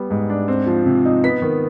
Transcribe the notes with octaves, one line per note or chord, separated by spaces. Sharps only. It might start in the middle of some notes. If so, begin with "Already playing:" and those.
Already playing: G3 B3
G#2
D4
C4
F3
C3
D#4
B3 B6
D#3